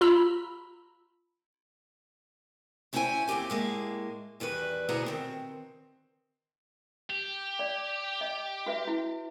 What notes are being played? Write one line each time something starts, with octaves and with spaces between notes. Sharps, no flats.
F4 A#5 B5 E6
A3 C#4 E4 C5 G5 G#5
D#2 A3 C4 G4 G#5
A2 G#3 A#3
E2 D#3 G3 B4
D2 B2 E4 G#4 F#5 A#5
D#3 F#3 C4
G4
D5
D#5
F#4 B4 E5
E4 F#4